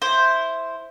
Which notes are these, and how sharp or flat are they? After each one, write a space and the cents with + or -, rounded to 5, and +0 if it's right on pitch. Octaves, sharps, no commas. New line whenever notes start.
E4 +0 C5 +0